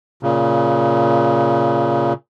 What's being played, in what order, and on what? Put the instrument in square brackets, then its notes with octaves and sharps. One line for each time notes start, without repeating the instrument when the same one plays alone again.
[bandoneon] A#2 C#3